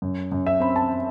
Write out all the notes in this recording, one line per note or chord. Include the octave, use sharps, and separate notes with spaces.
F#2
F#2
E5
C4 B5
A5